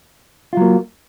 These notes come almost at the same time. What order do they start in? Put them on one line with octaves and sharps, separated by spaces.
F4 F#3 A#3